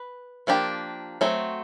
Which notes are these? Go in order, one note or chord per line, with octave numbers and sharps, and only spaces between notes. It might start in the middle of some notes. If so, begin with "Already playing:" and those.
Already playing: B4
F3 A#3 D4 G4
F#3 A3 C4